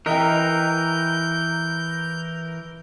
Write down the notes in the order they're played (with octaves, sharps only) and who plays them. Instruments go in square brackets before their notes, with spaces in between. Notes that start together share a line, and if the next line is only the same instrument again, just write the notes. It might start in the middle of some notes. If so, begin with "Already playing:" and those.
[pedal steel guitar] E3 A#4 [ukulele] D#5 E5 G5 [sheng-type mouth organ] G6